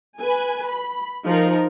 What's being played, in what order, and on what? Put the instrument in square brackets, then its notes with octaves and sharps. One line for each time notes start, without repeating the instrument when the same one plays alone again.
[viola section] B4 G#5
B5
F3 D#4 A#4